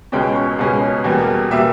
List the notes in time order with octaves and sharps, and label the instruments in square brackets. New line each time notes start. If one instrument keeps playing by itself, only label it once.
[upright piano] C#2 B2 G#3 C#4 G5
C#6
C#2 B2 G#3 C#4
E2 B2 G3 A#3
B2 G3 A#3 E5